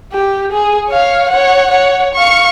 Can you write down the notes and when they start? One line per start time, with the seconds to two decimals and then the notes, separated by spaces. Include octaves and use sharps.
0.13 G4
0.52 G#4
0.88 C#5 F5
1.31 C#5 F#5
1.70 C#5 F#5
2.14 F5 C#6